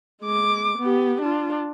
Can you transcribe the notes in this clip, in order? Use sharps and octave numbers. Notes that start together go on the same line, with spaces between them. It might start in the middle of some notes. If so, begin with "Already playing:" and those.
G#3 D6
B3 G4
D4 F4